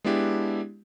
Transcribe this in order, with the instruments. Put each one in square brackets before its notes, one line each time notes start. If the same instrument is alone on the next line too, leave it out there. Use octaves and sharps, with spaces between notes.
[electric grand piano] G#3 B3 D4 E4 G4